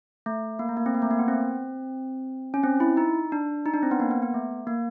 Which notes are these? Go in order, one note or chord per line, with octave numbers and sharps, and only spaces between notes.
A3
A#3
A3
A#3
C4
A#3
A3
A#3
B3
C4
C#4
C4
E4
D#4
D4
D#4
D4
C4
B3
A#3
B3
B3
A3
A#3